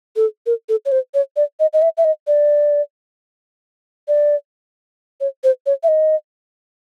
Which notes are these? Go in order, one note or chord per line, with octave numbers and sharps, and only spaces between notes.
A4
A#4
A4
C#5
C5
C#5
D5
D#5
D#5
E5
E5
D#5
D5
D5
C#5
C5
C#5
E5
D#5